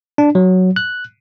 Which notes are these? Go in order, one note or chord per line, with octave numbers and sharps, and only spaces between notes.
D4
F#3
F#6